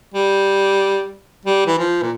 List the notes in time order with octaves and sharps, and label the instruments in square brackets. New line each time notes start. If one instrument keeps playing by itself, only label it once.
[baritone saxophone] G3
G3
E3
F3
A#2